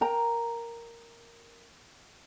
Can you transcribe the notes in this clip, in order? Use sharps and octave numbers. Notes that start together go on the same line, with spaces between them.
A#4 G5 A#5